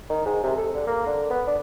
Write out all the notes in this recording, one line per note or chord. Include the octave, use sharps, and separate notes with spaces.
D#3
G#2
C3
A4
D3
A#3
D3
B3
D4